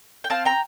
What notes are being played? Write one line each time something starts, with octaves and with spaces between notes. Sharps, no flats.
G5
C4 F5 A5
G5 A#5